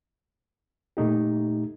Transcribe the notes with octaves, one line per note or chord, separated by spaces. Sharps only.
A#2 A3 D#4 G4